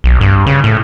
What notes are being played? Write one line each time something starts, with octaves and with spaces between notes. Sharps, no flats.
B1
G2
C#3
A2